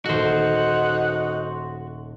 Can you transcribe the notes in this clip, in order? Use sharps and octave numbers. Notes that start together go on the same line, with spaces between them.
D#1 A3 D#4 F#4 C5 F#5